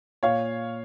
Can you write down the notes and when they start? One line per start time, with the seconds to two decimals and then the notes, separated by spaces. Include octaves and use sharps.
0.23 A#2 C#5 F5